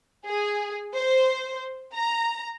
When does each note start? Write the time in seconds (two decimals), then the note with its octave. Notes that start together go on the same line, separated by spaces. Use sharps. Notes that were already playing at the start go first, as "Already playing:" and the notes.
0.25 G#4
0.95 C5
1.94 A#5